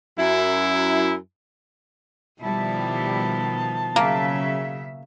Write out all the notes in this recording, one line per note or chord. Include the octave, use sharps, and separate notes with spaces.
F#2 E4
B2 D#3 F3 G3 E4 A5
C#3 F#3 A#3 E5